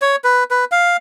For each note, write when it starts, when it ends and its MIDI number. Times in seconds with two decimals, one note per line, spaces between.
0.02 0.16 73
0.24 0.44 71
0.51 0.65 71
0.72 0.97 77